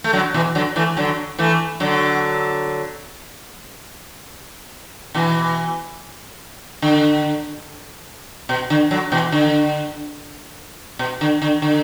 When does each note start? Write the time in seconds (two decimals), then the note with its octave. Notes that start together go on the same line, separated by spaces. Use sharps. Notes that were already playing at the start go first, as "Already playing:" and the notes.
0.04 A3
0.13 D3 F#3
0.34 B2 E3
0.55 D3 F#3
0.76 E3 A3
0.97 D3 F#3
1.38 E3 A3
1.80 D3 F#3
5.14 B2 E3
6.82 D3
8.49 B2
8.70 D3
8.91 D3 F#3
9.12 B2 E3
9.32 D3
10.99 B2
11.21 D3
11.42 D3
11.62 D3